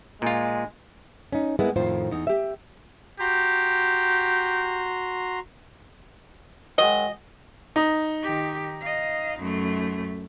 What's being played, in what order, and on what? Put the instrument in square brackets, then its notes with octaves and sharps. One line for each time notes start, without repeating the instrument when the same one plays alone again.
[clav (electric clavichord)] A#2 F4 [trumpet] G#3
[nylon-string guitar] C#4 D#4
G#3 A#3 B3 E4
F2 A2 D#3 F4 C5
E2 D#4
G4 E5
[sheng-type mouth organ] F#4 A#5 C6 [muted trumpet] G4
[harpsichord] D#3 F#3 G#3 [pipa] D#5
[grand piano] D#4
[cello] D#3 G4
D#5 F5
F#2 A3